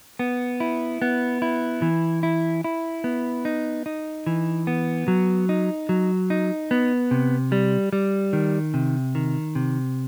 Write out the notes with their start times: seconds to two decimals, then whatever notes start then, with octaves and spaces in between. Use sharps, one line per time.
0.19 B3
0.60 E4
1.02 B3
1.42 E4
1.82 E3
2.23 E4
2.64 E4
3.04 B3
3.45 D#4
3.86 D#4
4.27 E3
4.67 B3
5.08 F#3
5.49 D#4
5.89 F#3
6.30 D#4
6.71 B3
7.11 C3
7.52 G3
7.93 G3
8.33 D#3
8.74 C3
9.15 D#3
9.55 C3